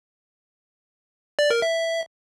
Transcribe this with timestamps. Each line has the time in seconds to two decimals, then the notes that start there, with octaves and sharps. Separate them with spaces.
1.39 D5
1.50 A#4
1.62 E5